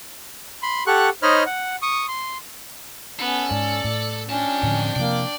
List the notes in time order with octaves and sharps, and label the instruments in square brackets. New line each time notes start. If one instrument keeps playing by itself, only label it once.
[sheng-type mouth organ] B5 C6
G4 A4 F#5 C#6 F#6
D#4 C5 C#5 D#5 B5 F6
F#5
C#6 D#6
C6
[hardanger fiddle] B3 [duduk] C#4 [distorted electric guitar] A4
[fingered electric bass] G#2 [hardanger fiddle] D5
[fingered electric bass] A2
[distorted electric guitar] F2 A5 [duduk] C#4 [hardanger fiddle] D4 G5
[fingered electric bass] A2 D3 F3
[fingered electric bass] C3 F3 [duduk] A#3 [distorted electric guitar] D5